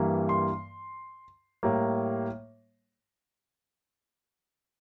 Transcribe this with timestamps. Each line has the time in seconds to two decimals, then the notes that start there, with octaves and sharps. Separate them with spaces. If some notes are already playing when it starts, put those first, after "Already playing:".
Already playing: G2 E3 G3 A#3
0.29 C6
1.63 A2 G3 A#3